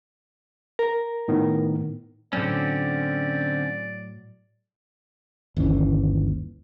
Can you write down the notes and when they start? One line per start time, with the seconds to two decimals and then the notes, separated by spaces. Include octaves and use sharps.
0.79 A#4
1.28 A2 D#3 B3
2.33 A2 D3 F#3 C4 C#4 D5
5.57 G1 D#2 E3 C#4